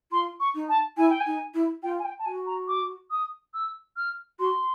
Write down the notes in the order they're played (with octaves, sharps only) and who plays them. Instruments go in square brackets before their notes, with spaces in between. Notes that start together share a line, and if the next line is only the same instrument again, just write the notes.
[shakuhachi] F4 [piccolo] C6
[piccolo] C#6
[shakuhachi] D#4
[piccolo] A5
[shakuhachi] E4 [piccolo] G#5
[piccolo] G5
G#5
[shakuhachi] D#4
E4
[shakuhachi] F4 [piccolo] G5
[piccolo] G#5
G5
A5
[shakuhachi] F#4 [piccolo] G#5
[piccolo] A#5
D6
D#6
E6
F6
[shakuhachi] F#4 [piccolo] C6